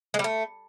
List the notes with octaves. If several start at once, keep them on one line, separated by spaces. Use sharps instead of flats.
G#3
G3
A3